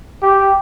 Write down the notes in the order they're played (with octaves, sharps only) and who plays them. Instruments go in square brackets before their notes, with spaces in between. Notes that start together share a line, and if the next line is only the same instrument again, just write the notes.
[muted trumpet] G4